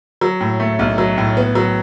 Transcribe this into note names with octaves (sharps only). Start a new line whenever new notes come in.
F#3
A2
A3
B1
F#3
A2
B3
F#3